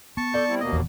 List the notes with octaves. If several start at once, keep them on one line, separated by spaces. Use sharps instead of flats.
B3 A5 C#6
A4 D5 G6
G3 C4 E4
D#2 B2 A#3 D#5
D#1 E2